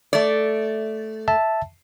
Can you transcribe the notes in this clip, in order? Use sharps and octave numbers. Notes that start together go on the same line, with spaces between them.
A3 D5
E5 A5